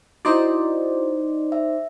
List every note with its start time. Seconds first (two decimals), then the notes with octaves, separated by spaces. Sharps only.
0.25 D#4 E4 F#4 C5 D5
1.52 E5